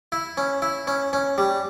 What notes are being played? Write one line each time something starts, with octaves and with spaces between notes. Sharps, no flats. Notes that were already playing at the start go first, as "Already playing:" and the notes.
E4
C#4
E4
C#4
C#4
G3